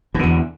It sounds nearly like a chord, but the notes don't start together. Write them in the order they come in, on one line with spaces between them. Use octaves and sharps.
B2 D3 E2